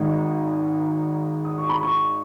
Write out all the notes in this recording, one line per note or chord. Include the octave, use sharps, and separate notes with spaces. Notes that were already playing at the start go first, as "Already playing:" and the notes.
Already playing: G#1 G#2 D#3 G#3 D#4
D#6
C#6
B5
C#6